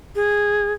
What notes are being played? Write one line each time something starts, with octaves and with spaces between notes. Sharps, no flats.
G#4